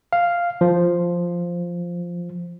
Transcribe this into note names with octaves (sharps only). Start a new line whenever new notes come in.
F5
F3